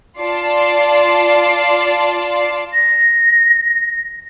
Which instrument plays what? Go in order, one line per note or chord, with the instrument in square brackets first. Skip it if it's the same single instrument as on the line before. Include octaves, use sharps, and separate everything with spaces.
[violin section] F4 D5 A5 C7
[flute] A#6